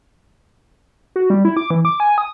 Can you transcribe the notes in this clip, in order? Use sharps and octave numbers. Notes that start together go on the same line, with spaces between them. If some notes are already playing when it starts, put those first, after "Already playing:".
F#4
G3
E4
D6
E3
D6
G#5
D#6